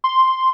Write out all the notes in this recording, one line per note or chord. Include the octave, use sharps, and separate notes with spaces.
C6